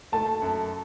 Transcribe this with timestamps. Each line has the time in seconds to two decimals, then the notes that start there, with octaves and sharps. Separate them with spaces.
0.12 A3 A5
0.42 F#2